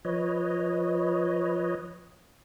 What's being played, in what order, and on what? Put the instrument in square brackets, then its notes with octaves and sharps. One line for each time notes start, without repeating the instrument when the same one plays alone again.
[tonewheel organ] F3 B4 C#5 D#5